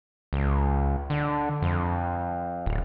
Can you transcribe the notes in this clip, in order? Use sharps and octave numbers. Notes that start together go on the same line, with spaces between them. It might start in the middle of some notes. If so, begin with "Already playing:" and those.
C#2
D3
F2
D1